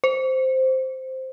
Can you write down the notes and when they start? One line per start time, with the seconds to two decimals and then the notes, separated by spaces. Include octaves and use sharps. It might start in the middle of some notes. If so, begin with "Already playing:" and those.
0.04 C5